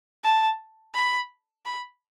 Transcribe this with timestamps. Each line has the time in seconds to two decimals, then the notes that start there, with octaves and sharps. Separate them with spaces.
0.24 A5
0.94 B5
1.65 B5